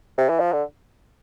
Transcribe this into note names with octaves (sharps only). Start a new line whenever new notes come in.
C3
E3
F3
D3